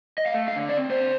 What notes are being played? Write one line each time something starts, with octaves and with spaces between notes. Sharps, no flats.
D#5
A3 F5
D3 F5
C4 D5
D3 C5